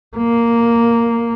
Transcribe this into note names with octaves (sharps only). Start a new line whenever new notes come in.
A#3